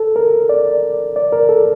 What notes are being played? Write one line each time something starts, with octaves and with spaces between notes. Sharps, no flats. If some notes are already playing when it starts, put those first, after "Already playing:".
Already playing: A4
A#4
D5
D5
A#4
A4